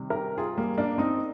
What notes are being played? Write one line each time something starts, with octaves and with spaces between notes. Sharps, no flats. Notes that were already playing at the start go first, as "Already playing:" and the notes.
Already playing: C3 D#3 G3
G4 A#4
F4 G#4
G3 A#3
A#3 D4
C4 D#4